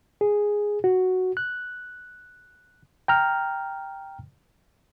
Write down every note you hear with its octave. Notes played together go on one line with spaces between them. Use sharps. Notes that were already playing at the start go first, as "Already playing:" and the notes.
G#4
F#4
F#6
G5 A#5 F6